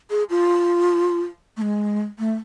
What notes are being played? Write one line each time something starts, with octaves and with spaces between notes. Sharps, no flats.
G#4
F4
A3
G#3
A3